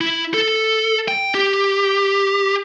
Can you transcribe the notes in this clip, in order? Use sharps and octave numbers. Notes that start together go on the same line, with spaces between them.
E4
A4
G5
G4